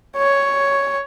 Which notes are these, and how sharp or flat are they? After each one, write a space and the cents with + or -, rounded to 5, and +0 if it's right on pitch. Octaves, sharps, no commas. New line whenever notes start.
C#5 +5